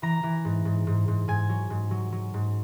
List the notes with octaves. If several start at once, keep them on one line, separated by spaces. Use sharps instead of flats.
E3 A#5
E3
G#2
G#2
G#2
G#2
G#2 G#5
F#3
G#2
F#3
F#3
G#2